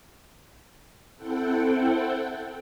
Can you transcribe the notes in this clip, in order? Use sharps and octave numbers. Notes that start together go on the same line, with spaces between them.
C4 E4 A4 F#5 G5